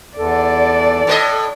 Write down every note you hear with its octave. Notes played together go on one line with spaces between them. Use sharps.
E2 A4 D5
A2 B4 D#5